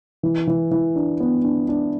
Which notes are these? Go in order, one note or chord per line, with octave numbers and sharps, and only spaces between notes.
E3
E3
E3
D4
B3
D4
D4